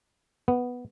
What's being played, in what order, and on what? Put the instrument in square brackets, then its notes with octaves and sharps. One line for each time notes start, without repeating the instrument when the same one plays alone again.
[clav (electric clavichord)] B3